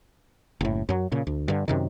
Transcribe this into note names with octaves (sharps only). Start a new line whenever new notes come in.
F#1 A2
F#2 F#3
A#2 C#3
D2
G2 D3
F#2 C3 D#3